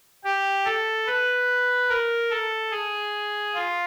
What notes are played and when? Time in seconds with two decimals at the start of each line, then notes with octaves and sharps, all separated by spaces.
0.24 G4
0.65 A4
1.07 B4
1.89 A#4
2.30 A4
2.71 G#4
3.54 F4